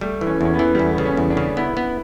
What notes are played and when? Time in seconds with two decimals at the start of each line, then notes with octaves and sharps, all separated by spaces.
0.01 G3 A3
0.21 E3
0.27 C#4
0.41 E2 C#4
0.54 B3
0.59 E3
0.75 E2 G3
0.85 A3
0.95 C#3 B3
1.05 C#4
1.17 E2
1.30 D4
1.37 C#3
1.57 B3 E4
1.77 B3